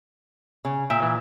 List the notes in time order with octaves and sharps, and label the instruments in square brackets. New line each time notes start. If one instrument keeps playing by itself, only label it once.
[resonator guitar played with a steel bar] C#3
[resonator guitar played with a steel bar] A#2 [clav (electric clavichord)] E5 G5
[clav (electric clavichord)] E3